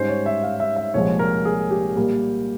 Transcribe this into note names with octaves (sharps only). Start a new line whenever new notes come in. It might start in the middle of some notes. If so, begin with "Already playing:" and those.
Already playing: G#2 G3 C#4 C5
C#5
E5
F5
E5
E5
C2 A#2 F3 G#3 C#5
A#4
G#4
G4
A#2 G3 A#3